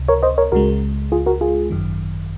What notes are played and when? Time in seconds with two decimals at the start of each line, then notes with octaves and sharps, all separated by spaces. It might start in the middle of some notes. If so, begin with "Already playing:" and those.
Already playing: C#2 C3
0.08 A#4 C#5
0.23 C5 D#5
0.38 A#4 C#5
0.52 C#2 C#3 G#3 F#4 A#4
1.12 F4 G#4
1.26 F#4 A#4
1.41 F4 G#4
1.70 G#1 F#2 D#3